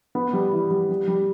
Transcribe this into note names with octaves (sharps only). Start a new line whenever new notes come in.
B3
G3
E3
G3
G3
G3